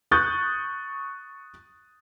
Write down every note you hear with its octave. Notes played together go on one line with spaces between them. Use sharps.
C#6 D#6 F#6 G6 A6